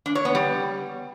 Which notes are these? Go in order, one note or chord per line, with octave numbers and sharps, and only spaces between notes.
D4
C#5
B3
G3